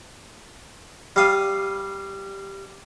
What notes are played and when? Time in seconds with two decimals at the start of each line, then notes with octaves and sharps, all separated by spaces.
1.16 G3 F5 D#6